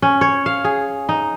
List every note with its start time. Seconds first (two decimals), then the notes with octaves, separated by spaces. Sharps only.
0.02 C#4
0.21 C#5
0.46 F5
0.64 G#4
1.09 D#4